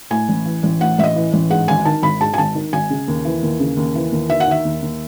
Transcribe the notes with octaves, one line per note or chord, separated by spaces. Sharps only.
A2 G#5
A1
E3
A1
A2 F#5
A1 E5
D#5
E3
A1
G#2 F#5
G#1 G#5
D#3 A5
G#1 B5
G#2 A5
G#5
G#1 A5
D#3
G#1 G#5
C#3
D#2
E3
D#2
C#3
D#2
E3
D#2
D#3 E5
F#5
D#3 E5
D#2
D#2